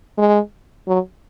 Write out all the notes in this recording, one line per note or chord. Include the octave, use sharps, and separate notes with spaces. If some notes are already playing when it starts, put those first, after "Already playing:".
G#3
F#3